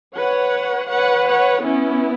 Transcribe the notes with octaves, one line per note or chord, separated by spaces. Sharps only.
B4 C#5 F#5
B4 C#5 F#5
C#5 F#5
B3 C#4 E4